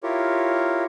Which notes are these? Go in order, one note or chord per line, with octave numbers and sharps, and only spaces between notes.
E4 F4 G4 A#4 C#5